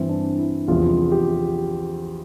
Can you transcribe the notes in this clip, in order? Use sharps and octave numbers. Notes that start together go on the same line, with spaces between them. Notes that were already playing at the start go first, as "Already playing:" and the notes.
Already playing: G2 E3 C4
D4
E4
E2 C3 F3 F4
G4